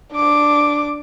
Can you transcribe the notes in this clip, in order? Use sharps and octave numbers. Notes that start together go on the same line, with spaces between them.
D4 D6